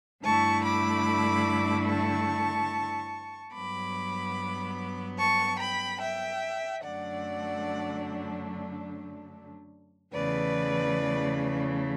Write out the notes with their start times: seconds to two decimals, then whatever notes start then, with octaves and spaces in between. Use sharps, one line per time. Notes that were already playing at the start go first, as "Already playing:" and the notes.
0.24 G2 D3 A3 E4 A5 C#6
0.65 B5 D6
1.88 A5 C#6
3.54 G2 F#3 B3 B5 D6
5.18 A5 C#6
5.60 G5 B5
6.01 E5 G5
6.83 F#2 D3 F#3 A3 D4 D5 F#5
10.13 E2 C#3 E3 A3 B4 D5